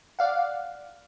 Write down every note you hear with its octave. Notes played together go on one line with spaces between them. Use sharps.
D5 F5 F#5